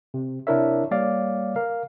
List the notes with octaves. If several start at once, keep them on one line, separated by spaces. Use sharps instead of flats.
C3
C3 D4 E4 A#4 C#5 E5
G3 A#3 C#5 D5 F5
A#4 F5